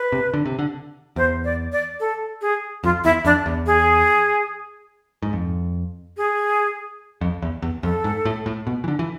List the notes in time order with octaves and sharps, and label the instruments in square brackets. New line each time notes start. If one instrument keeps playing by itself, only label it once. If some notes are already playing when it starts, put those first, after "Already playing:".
Already playing: [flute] B4
[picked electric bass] C3
D3
C3
D3
[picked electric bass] E2 [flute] C5
[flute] D5
D5
A4
G#4
[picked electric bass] F2 [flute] F4
[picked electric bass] E2 [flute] E4
[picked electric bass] F2 [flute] D4
[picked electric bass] E2
[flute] G#4
[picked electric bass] G#2
F2
[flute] G#4
[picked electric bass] F2
E2
E2
[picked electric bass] F2 [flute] A4
[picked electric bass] G#2
A2
A2
B2
E3
D3
E3